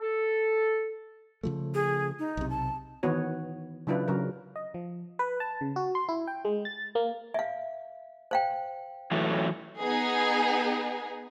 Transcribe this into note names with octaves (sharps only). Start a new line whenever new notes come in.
A4
C#3 F3 A3
G#4
D#4
B1 C3
A5
D#3 E3 B3 F#4 C#5
C#3 F#3 D4 E4 F4 B4
C#3 F#3 A#4
D#5
F3
B4
A5
C#3
F#4
C6
E4
G5
G#3
A6
A#3
E5 F5
C5 F5 G5
E3 F#3 A3
B3 D#4 G#4